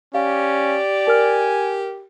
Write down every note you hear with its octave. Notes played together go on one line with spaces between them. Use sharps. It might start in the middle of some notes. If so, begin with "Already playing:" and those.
C#4 G4 D5 F5
A#4 G#5 F6